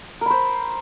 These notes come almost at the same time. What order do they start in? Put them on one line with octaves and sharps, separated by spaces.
A#4 B5 C5